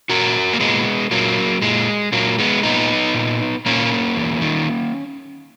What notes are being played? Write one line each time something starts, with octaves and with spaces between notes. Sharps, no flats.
A#2 F#4 A#4
A#3
A#2 G#3 B3
A#2 F#3 A#3
A#2 G#3
A#2 F#3 A#3
G#3 B3
A#2 B3 D#4
A#2
A#2 A#3 C#4
E2
D#3